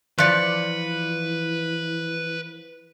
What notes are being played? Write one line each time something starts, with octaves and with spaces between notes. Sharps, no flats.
E3 F3 B4 D5 F#6 C#7